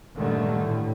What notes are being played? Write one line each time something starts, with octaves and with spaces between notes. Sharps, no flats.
G2 A#2 D3 D#3 G3 A3
A2